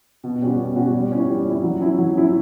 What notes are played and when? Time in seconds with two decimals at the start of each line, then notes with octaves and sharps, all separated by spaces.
0.24 B2
0.42 G3 C#4 F#4
0.58 B2
0.76 G3 C#4 F#4
0.94 G3
1.12 C#4 E4
1.29 G3
1.46 C#4 E4
1.63 F#3
1.81 C#4 E4
1.98 F#3
2.15 C#4 E4